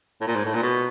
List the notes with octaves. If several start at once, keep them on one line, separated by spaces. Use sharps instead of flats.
A2
A#2
G#2
A2
A#2
B2